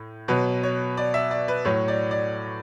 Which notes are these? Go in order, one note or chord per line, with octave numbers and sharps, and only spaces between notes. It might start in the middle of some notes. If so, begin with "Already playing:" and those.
Already playing: A2
B2 F#3 B4
C#5
D5
E5
D5
B4
A2 F#3 C#5
D5
D5